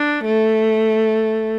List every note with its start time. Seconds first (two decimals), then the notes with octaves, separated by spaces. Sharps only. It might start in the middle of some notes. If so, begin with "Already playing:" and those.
Already playing: D4
0.25 A3